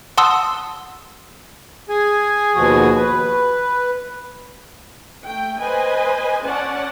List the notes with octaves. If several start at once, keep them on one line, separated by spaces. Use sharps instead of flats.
F#5 A5 C6 D#6 E6
G#4 G#5
D#2 B2 F3 F#4 G#4 G#5
B4
A3 G5
B4 C5 D#5 G#5
C#4 D5 F#5 A5